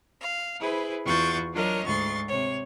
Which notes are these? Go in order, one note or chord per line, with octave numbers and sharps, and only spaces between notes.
F5
E4 G#4 B4 C5
E2 F4 F#4 C#6 G6 A6
F#3 D4 F4 A#4 C#5 D#5
D2 G#2 C6 C#6 A6
C3 C#5